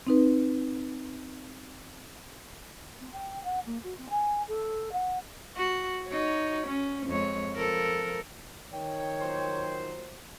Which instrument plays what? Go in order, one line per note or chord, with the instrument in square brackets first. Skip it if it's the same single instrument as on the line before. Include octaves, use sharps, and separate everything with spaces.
[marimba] C4 D#4 B4
[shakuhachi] C4
G5
F#5
A#3
F#4
C4
G#5
A4
F#5
[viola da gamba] F#4
D#4 F#4 C#5
C#4
F2 G#3 C#5
F3 A4 A#4
[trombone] D#3 [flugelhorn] C#5 [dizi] G5
[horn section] A#2 F#3 C5